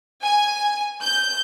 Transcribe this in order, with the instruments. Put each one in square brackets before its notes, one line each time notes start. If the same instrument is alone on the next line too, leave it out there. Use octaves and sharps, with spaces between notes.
[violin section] G#5
G6